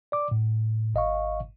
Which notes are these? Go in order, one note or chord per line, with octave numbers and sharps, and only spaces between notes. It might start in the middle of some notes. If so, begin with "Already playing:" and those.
D5 D6
A2
G#1 D#5 F5 C#6